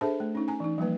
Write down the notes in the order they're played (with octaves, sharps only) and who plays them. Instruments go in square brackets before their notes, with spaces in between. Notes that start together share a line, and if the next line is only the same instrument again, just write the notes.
[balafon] D4 G#4 A4 C5 E5 A5
A3
C#4 D#4
G#5 A#5
E3 D#4
F3 G3 A#3 B4